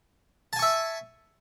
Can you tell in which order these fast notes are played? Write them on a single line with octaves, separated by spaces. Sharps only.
A5 G#5 C#6 E5